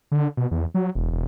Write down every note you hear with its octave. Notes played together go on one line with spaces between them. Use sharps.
D3
B2
E2
F#3
E1
E1